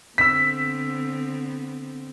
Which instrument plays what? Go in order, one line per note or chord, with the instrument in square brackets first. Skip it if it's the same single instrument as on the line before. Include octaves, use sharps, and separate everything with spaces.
[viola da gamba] D3 B3 C4 [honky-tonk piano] E6 B6